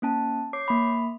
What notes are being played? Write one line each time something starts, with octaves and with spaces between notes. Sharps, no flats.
A#3 C#4 A5
C#5 D6 C7
A#3 B5